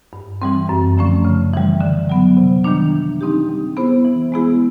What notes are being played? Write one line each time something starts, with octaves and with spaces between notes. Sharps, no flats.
G2
E3 G3 C4
F#2
D3 F3 A3 C#4
C#3
E3 G3
D3
F#3 B3
C3
D#3 G3 A#3 D4
E3
G3 C4 D#4 G4
G3
B3 E4 G#4 C5
E3
G#3 B3 E4 G#4